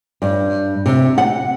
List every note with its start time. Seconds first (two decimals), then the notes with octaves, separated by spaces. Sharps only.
0.22 G2
0.86 C3
1.18 F#5